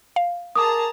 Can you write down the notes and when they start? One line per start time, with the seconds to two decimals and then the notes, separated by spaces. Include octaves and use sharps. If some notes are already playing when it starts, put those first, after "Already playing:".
0.16 F5
0.56 G#4 A#4 A5 A#5 D6 D#6